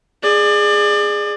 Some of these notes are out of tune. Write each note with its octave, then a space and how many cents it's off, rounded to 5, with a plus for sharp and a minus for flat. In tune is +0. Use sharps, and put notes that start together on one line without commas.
G#4 -5 D5 +30